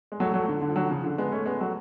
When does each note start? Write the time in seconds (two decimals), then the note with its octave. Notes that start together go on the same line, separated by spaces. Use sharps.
0.12 G#3
0.20 F#3 A3
0.34 F#3 A3
0.43 F3
0.48 D3
0.61 D3
0.69 F3
0.76 D3 F#3
0.89 C#3 F3
1.04 D3
1.18 G#3 B3
1.32 A3 C#4
1.46 G#3 B3
1.60 F#3 A3